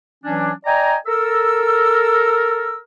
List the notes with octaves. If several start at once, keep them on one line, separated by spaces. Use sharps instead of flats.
E3 F#3 C#4 D4
D5 D#5 G5 G#5 A#5
A4 A#4 E6